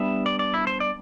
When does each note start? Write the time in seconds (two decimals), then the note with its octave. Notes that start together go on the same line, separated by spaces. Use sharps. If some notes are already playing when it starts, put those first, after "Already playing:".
Already playing: G3 B3 D4 E5
0.26 D5
0.39 D5
0.54 E4
0.67 C5
0.80 D5